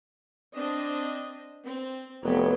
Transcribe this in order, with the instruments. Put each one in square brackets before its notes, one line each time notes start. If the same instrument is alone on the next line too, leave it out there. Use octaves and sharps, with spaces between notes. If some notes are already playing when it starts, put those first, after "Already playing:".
[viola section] C4 D4 D#5
C4
[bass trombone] F1 [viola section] F#3 B3